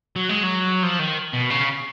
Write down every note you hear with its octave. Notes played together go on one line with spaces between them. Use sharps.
F#3
G#3
F#3
F3
D#3
B2
C#3